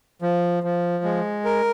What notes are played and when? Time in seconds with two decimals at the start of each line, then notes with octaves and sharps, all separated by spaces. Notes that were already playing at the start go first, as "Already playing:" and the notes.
0.22 F3
0.64 F3
1.04 G#3
1.45 A#4